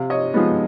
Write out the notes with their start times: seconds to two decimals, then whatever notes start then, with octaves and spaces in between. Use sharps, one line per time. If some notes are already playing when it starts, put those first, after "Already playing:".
Already playing: C3 F5
0.10 C#5 D#5
0.34 F3 G#3 B3 D#4